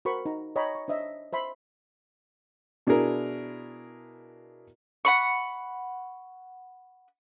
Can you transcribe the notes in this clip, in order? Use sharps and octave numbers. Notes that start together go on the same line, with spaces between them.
F#4 A#4 C5 B5 C#6
D#4 A#5
C#5 D#5 G5 A#5 B5
C#6
D4 C5 D#5 E5
C5 E5 B5 C6
B2 D4 E4 G#4 A#4
F#5 B5 C#6